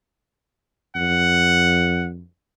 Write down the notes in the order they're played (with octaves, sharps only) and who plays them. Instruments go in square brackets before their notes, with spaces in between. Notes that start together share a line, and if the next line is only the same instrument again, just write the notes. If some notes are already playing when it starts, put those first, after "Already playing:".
[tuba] F2 [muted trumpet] F#5